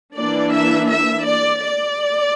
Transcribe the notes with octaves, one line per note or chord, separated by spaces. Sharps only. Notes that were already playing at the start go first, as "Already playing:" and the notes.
E3 A#3 D4 D5
E5
E5
D5
D5